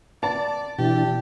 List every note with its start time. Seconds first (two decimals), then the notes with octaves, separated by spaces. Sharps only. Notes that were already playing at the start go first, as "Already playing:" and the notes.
0.23 D5 A5
0.78 B2 E3 D4 E4 G4